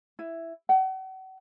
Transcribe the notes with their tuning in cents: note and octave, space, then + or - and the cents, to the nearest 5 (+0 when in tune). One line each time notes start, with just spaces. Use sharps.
E4 +5
F#5 +40